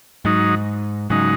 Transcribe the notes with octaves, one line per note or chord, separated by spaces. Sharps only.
G#2 F#3 D#4
G#2 C#3 F#3 D#4